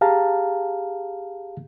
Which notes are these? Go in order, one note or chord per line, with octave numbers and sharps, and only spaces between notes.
G4 G#4 F5 A5 A#5